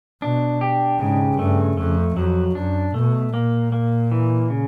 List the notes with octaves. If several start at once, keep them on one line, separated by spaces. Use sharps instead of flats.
B2 D4
G4
G#2 C#3
G2 A3
F2 A3
F2 F#3
F#2 D4
B2 A3
A#2 A#3
A#3
E3
C#3